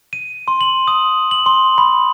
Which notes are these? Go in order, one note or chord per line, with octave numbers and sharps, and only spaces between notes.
D#7
C6
F#7
D#6
F#7
C6
B5